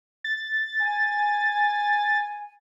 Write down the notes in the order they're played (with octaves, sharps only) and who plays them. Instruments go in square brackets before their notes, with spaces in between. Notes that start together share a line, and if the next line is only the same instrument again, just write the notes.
[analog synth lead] A6
[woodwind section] G#5